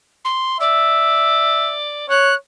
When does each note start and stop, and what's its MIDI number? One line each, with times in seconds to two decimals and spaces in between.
0.25 0.58 84
0.61 2.09 74
0.61 1.75 76
2.10 2.34 73
2.10 2.34 90